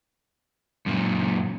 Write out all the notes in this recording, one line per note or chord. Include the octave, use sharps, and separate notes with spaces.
F#2 A#2